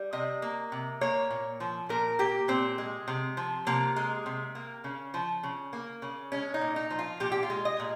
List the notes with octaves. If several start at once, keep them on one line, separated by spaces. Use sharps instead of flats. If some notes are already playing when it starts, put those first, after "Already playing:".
Already playing: G3
C3 D#5
A#3
C3
A#3 C#5
A#2
F3
A#2 A#4
A#3 G4
A#2 C4
G#3
C3
F3
C3 A#3
G#3
C3
A#3
C#3
F3
C#3
A#3
C#3
G#3 C#4
D#4
A#2
D#4
F3
F4
A#2 G4
G4
F4
G#3
D#5
A#2